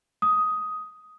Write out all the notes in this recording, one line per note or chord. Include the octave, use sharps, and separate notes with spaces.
D#6